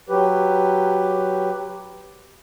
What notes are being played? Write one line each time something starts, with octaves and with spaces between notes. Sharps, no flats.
F#3 G4 B4